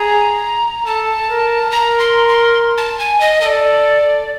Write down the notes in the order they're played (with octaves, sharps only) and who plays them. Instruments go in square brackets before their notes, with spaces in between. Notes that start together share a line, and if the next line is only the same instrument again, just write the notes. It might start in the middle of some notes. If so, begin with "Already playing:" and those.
Already playing: [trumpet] G#4 [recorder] A#5
[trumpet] A4 [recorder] A5
[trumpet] A#4
[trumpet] A#4 [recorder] A#5
[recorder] C6
C6
A5
G#5
D#5
[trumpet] A4 [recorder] D#5
[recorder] D5